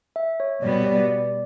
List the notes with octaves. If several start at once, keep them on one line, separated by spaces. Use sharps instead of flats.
E5
C#5
B2 G3 B3 D5
D5